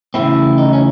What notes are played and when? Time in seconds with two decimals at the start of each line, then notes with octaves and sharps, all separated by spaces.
0.14 C#3 E3 A3 C4 E4
0.58 D#4
0.73 C#4